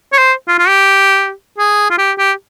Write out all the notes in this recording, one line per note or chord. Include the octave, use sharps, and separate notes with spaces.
C#5
C5
F4
F4
G4
G#4
F4
G4
G4